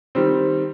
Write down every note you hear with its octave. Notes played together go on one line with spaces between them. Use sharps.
D#3 G3 C4